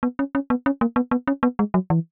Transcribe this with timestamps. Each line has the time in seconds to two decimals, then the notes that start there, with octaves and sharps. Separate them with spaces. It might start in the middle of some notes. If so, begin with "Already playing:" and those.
0.03 B3
0.19 C#4
0.35 C#4
0.50 B3
0.66 C#4
0.81 A#3
0.96 B3
1.11 B3
1.27 C#4
1.43 B3
1.59 G#3
1.74 F#3
1.90 E3